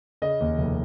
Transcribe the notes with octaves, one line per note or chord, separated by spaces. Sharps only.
C#3 D#5
D#2
F1